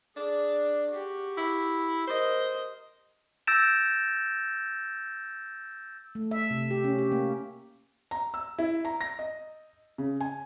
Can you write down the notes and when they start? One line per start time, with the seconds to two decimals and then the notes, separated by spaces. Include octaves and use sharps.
0.16 D4 G#4
0.90 F#4 G4
1.38 E4
2.07 A#4 C5 D#5
3.47 E6 G6 A6 A#6 D7 E7
6.15 A3
6.31 E5
6.50 C3
6.71 G4
6.84 C#4
6.99 G4
7.12 A#3
8.11 A#5
8.34 E6
8.58 E4
8.85 A#5
9.01 A#6
9.19 D#5
9.98 C#3
10.21 G#5